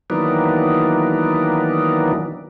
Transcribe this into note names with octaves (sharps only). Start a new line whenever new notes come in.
D#3 E3 F#3 A#3 B3 D4